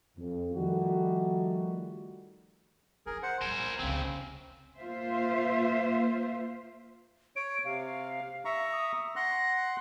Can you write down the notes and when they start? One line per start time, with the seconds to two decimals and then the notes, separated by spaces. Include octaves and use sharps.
0.17 F2
0.54 D#3 F3 G3 A3 D#4 F#4
3.06 D4 D#4 G#4 A#4
3.23 C5 F#5
3.41 A#2 G3 A#4 C5 G#5
3.80 F1 C#2 C#3 C4
4.78 A#3 F4 C5 E5
7.36 C#5 D7
7.65 C3 F5
8.45 E5 A#5 C#6
8.73 D#6
9.16 F#5 C6 F#6 A#6